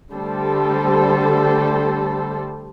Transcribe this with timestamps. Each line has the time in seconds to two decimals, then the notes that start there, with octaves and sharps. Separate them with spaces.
0.13 D3 G3 A3 A4 C5